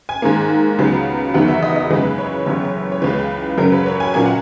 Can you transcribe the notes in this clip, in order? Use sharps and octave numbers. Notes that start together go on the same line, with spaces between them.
G#5
G#2 D#3 A#3
C#2 C#3 F#3 B3
E2 D#3 F#3 B3 F#5
E5
D#5
D#5
F#2 C#3 E3 G#3 B4
C#5
F#1 F#2 E3 B3 C#5
C#5
C#2 C#3 E3 B4
F#2 C#3 F#3 C#4 A#4
B4
C#5
G#5
A#2 F#3 A#3 C#4 G#5
F#5